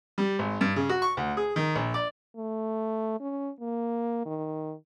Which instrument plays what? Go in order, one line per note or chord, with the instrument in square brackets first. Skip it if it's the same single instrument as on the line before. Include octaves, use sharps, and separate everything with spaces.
[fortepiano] G3
G#1
G2
C#3
F#4
C#6
D2
G#4
D#3
A#1
D5
[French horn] A3
C#4
A#3
D#3